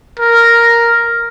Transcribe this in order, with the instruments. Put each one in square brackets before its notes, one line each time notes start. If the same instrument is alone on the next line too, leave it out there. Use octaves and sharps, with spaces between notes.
[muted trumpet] A#4